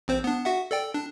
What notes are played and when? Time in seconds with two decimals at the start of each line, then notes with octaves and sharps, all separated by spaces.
0.08 A1 C4 C5
0.24 B3 D4
0.45 F#4 E5 F#5
0.71 A4 D5 G5
0.94 D4